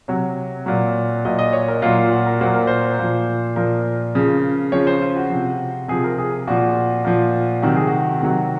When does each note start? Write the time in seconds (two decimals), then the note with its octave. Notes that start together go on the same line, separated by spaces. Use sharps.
0.08 C3 F#3 C#5
0.66 A#2 F#3
1.25 A#2 F#3 D#5
1.39 D#5
1.53 C#5
1.68 A#4
1.82 A#2 F#3 F4
1.96 F4
2.11 F#4
2.26 A#4
2.41 A#2 F#3 C5
2.54 A#4
2.67 C5
2.99 A#2 F3
3.56 A#2 F3 A#4
4.15 C#3 F3
4.72 C#3 F3 C#5
4.87 C5
5.02 F4
5.16 F#4
5.30 C3 F3
5.88 C3 F3 G#4
6.04 A#4
6.18 G#4
6.47 A#2 F3 F#4
7.04 A#2 F3
7.62 C3 D#3 F#3 F#4
7.76 G#4
7.87 F#4
8.20 C3 D#3 F#3